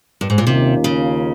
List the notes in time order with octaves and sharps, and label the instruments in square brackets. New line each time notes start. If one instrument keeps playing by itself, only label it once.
[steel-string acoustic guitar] G2
G#2
A#2
[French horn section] D#2 D#3 A#3 C#4 F4 [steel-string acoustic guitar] C3
[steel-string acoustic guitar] C#3